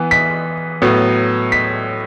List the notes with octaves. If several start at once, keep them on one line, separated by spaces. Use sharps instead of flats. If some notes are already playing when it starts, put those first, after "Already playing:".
Already playing: E3 B3
B6
A2 F#3 B3
B6